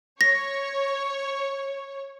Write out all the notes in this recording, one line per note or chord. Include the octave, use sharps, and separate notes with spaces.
C#5 A#6